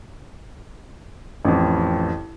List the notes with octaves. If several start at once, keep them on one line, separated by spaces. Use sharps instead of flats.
A1 F2